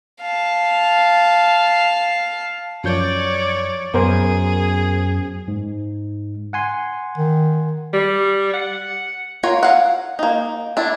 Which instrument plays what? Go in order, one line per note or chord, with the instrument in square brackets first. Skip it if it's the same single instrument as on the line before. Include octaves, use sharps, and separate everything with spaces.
[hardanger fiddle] F5 A5
[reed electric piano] F#2 F3 G6 [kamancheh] C#5 D5
[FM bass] F#2 [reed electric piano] B3 A#4 C5 [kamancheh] G#4
[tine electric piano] G#2
F#5 G#5 C6
[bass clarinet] D#3
[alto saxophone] G3
F#5
[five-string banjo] F4 F#4 A#4 C#5 F5
F5 F#5
A#3 D#4
D4 E4 A5